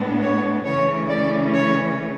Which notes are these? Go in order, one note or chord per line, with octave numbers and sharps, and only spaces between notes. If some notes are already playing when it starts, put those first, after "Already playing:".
Already playing: A2 G#3 B3 D4
C#5
C#3 E3 A3 C#4 C#5
D5
C#5